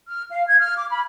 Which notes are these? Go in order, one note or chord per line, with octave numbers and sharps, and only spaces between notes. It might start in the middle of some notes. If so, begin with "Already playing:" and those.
F6
F5
G#6
F6
D6
B5